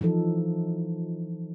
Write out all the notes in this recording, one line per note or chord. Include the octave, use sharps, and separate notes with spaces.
E3 F3 D#4 A4